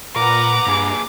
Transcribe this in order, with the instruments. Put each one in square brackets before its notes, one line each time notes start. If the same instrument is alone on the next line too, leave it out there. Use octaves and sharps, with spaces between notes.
[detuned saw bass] A#2 [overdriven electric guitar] A#4 [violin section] B4 F#5 A#5 [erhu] D6
[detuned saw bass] G2 [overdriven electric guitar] A#2 G#4